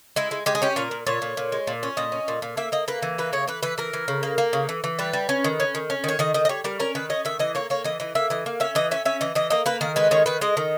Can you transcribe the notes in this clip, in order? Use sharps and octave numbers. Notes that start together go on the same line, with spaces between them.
G#3 E4
G#3
G#3 G4
G#4
C#4 G4
A#2 A#4
A#2
A#2 C#5
A#2
A#2
G#3
A#2
C#4
A#2 D#5
C#4
A#2
A#2
A#3 E5
A#3 D#5
A#3 B4
E3
A#3 B4
C#3 C#5
E3 B4
E3 B4
E3 A#4
E3
C#3
A#3
A#3
C#3
E3
E3
G3 B4
G3
C#4
D#3
C#4
D#3
C#4
D#3 C#5
D#3 D#5
D#3 D#5
D#5
G3 C#5
G3 A#4
C#4 A#4
D#3 B4
C#4 D#5
D#3 E5
E3 D#5
A#3 C#5
A#3 C#5
E3 D#5
E3 D#5
A#3 E5
E3 D#5
A#3
C#4 E5
E3 D#5
C#4 E5
C#4 E5
E3 D#5
E3 D#5
A#3 D#5
A#3 B4
D#3 A#4
G#3 B4
D#3 C#5
D#3 B4
G#3 D#5
D#3